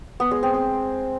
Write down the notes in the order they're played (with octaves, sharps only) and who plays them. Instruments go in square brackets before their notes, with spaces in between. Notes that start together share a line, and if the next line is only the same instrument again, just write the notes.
[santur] B3
G#3
C4
C4